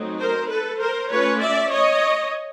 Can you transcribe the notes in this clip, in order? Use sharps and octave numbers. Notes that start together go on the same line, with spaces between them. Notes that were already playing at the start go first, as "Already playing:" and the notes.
Already playing: F#3 A3 C4 D#4
A#4 C5
A4 B4
A#4 C5
A3 C#4 F4 B4 C#5
D5 E5
C#5 D#5